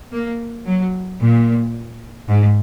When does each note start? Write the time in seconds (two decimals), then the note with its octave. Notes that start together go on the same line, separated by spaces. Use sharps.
0.12 A#3
0.66 F#3
1.20 A#2
2.28 G#2